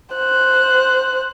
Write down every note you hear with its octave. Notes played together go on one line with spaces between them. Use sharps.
C5 F#6